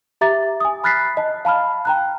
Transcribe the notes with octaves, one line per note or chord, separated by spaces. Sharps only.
G4 E5 A#5 D6 A6
G#5 D#6
B5 F6 F#6 A6 B6 C7
D#5 A5
F5 A5 B5 F6
G5 A#5 F#6